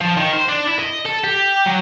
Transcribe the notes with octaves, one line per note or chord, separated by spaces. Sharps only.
F3
D#3
C5
D4
E4
D#5
A4
G4
F#3